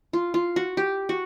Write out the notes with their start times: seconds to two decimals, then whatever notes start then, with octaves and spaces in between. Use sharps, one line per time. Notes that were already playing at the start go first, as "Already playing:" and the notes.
0.13 F4
0.34 F4
0.56 F#4
0.77 G4
1.09 F#4